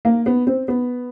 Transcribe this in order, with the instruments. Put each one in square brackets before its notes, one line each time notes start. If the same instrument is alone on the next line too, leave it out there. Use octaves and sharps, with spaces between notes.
[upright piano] A#3
B3
C4
B3